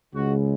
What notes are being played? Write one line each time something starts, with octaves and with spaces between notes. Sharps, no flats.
C#2 C#3 G#3 F#4